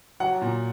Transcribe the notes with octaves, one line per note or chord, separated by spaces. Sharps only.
F#3 F#5
A#2